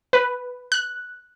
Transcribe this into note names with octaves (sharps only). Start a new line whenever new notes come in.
B4
F#6